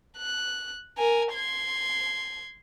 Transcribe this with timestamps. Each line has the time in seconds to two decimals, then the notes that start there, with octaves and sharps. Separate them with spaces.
0.18 F#6
0.98 A#4 G#5
1.33 C6 G#6